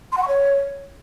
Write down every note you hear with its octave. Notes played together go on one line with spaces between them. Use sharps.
C6
F#5
C#6
C#5